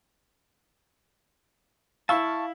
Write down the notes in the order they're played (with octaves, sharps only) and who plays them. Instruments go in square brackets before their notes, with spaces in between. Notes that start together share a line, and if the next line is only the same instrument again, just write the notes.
[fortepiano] E4 E6 [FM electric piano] F5 [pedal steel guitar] A5 C#6